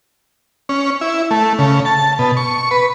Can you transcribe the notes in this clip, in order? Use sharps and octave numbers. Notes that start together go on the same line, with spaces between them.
C#4
E4
A3
C#3
A5
B2
C#6
B4